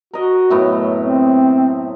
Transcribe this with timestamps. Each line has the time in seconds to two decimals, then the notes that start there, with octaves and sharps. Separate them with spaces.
0.13 F#4 A#4 D#5
0.50 F#2 A2 B3
1.01 C4